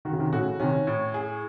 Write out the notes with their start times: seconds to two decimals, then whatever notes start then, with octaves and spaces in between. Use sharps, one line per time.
0.05 D#3 F#4
0.13 C#3
0.19 C3 D#3
0.32 A2 C#3 F#4
0.60 C3 D#3 C#4
0.87 A2
1.14 G#4